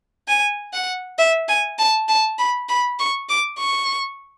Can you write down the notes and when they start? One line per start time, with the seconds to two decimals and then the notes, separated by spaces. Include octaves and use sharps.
0.28 G#5
0.73 F#5
1.19 E5
1.49 G#5
1.79 A5
2.09 A5
2.39 B5
2.69 B5
3.00 C#6
3.30 D6
3.59 C#6